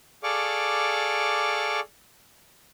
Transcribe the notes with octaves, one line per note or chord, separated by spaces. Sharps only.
G#4 A4 D5 F5 C#6 D6